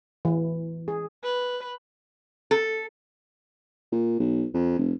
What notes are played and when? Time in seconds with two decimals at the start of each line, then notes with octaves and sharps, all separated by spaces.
0.25 E3
0.88 G#4
1.24 B4
2.51 A4
3.92 A#2
4.20 B1
4.54 F2
4.79 F1